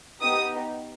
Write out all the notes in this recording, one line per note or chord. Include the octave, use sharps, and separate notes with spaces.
B3 D#4 G4 D#6